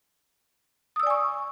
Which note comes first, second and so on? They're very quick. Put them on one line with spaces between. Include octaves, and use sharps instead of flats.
D#6 E6 D5 G#5 C#6